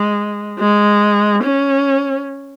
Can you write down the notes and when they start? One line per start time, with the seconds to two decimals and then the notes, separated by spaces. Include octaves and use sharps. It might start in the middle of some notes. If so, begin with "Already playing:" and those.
Already playing: G#3
0.59 G#3
1.43 C#4